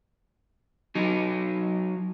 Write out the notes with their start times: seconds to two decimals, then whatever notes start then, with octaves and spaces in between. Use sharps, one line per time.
0.95 F#3 D#4